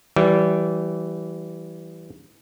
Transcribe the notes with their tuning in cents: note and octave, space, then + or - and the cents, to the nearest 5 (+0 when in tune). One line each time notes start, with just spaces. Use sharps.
E3 +0 G3 -25